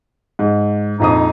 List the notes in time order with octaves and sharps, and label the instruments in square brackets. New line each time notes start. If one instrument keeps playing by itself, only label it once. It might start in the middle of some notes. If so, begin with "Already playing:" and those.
[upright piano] G#2
[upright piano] A#1 F2 D#6 [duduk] D#4